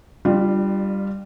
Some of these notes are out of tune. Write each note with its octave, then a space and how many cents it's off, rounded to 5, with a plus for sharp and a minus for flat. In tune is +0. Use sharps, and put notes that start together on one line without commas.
G3 +0 D4 +35 F4 +0